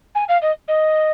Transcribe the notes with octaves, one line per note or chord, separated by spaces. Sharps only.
G#5
F5
D#5
D#5